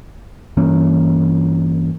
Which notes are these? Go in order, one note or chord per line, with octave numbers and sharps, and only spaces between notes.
G2 E3 A#3 C#4